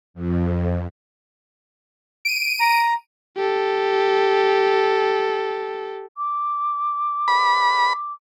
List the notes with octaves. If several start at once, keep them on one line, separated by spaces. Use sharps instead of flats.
F2
D7 D#7
A#5
G4 A4
D6
B5